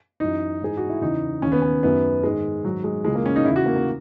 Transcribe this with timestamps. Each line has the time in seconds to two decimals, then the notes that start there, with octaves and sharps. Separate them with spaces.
0.20 F#2 E3 D#4
0.61 G#2 E3 G#4
0.77 F#4
0.90 E4
1.02 E2 C#3 E3 D#4
1.42 D#2 D#3 C#4
1.52 B3
1.62 C#4
1.83 F#2 D#3 B3
2.23 G#2 D#3 G#3
2.64 G#2 D#3 F#3
2.84 G#3
3.04 C#2 C#3 E3 G#3
3.15 A#3
3.26 C#4
3.36 D#4
3.45 E2 C#3 E3 E4
3.56 F#4
3.66 A#3
3.76 A#3